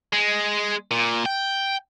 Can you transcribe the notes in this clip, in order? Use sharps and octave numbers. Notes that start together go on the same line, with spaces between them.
G#3
A#2
G5